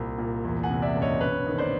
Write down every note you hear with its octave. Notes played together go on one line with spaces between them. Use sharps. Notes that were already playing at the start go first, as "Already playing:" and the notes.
Already playing: C2 A#2
A#2
E2
F#5 G#5
C3
D5 E5
F#1
C#5 D#5
E1 B4 C#5
D#3
C5 D5